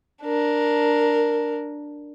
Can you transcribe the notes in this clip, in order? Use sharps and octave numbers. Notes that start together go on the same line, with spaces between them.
D4 A#4